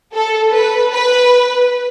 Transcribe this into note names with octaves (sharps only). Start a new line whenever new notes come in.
A4
B4
B4